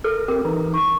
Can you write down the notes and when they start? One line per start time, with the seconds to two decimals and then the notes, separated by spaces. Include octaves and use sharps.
0.04 A4 A#4
0.28 C4 G4 A#4
0.45 E3 D#4
0.74 C#6